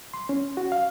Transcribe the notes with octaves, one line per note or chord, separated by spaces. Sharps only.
C6
C#4
F#4
F5